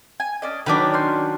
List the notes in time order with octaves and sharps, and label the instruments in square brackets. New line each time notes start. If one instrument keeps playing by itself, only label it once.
[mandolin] G#5
C#4 D4 D#5
[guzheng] D#3 F#3 D4 [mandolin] B4 D5
[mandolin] C#4 C6 G6